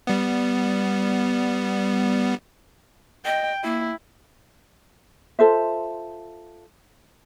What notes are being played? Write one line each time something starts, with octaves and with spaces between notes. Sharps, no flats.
G3 B3
D#5 G5
A#3 E4
F4 A4 C5 E5